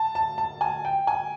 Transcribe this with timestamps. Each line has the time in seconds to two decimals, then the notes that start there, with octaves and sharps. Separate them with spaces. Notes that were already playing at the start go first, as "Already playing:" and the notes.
Already playing: A5
0.15 A5
0.38 A5
0.61 G#5
0.85 G5
1.07 G#5